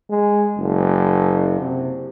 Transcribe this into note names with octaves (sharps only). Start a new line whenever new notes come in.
G#3
F#1
C3